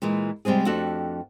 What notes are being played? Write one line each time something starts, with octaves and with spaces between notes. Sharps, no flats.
A#2 E3 G#3
C3 G3 G#3 C4 G#4
F2 A3 D4 F#4 G4 A4